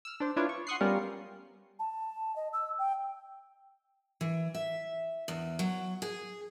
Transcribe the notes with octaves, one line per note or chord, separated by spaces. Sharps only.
E6 F6
D4 C5
D4 E4 F4 B4 C#5 D5
C#6
F#5 C6 C#6 D#6 F#6 C7
G3 B3 C#4 F4 A#4
A5
D#5
E6
G5
E3
E5
E2
F#3
G#4